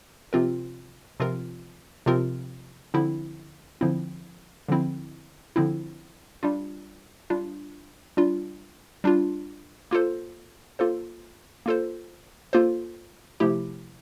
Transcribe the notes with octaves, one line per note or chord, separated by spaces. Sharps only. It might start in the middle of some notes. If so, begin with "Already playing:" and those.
C3 F3 C4 F4 A#4
C3 F3 C4 F4 A#4
C3 F3 C4 F4 A#4
D3 F3 C4 E4
D3 F3 C4 E4
D3 F3 C4 E4
D3 F3 C4 E4
G3 D4 F4
G3 D4 F4
G3 D4 F4
G3 D4 F4
A#3 F4 A4 C5
A#3 F4 A4 C5
A#3 F4 A4 C5
A#3 F4 A4 C5
C3 F3 A3 E4 G4